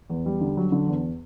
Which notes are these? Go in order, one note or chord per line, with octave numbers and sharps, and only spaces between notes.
E2
G3
D3
F#3
D3
E2